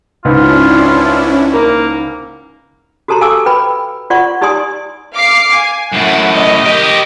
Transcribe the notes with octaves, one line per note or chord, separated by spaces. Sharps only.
C#2 G#2 C#4 D4 E4 F4
A#3 A#4
F#4 G4 A4 A5 A#5 C6
A4 F5 G#5 C#6 D6 E6
B4 G5 B5
F4 D5 F#5 C6 C#6
D#4 G4 D5 G#5 C6 D#6
F5 D6 C7
G#5
F#2 A2 F#5
D#5
G4 A#4